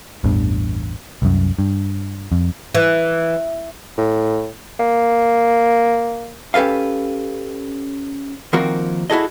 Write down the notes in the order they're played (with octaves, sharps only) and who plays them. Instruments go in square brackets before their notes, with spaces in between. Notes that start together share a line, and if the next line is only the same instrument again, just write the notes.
[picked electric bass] A1 E2 G2
C2 F#2
G2
F2
[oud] E3
[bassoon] A2
A#3
[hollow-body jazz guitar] C#4 G4 A4 B4 F5
D#3 F3 A#3 C4 F#4 A#4
E4 F#4 G#4 A4 D#5